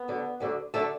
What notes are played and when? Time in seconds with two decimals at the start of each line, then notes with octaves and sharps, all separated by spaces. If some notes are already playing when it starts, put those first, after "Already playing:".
Already playing: B3
0.08 D2 D3 F#3
0.40 D2 D3 F#3
0.74 D3 F#3 A3 A4